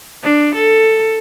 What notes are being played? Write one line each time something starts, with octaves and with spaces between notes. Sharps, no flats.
D4
A4